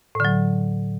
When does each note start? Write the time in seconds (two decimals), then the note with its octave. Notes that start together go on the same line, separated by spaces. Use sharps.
0.15 A2
0.20 D3
0.25 F#3